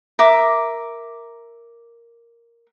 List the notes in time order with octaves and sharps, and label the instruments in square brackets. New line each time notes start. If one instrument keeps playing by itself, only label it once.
[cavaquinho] A#4 E5 D6